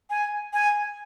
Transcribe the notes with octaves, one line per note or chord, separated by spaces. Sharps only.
G#5
G#5